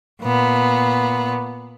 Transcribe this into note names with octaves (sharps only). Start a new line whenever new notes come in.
A#2 B3